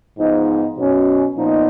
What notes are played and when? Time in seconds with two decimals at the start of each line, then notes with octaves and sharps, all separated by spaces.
0.17 G#2 F3 B3 D#4
0.77 B2 F#3 C#4
1.36 A#2 F3 B3 D#4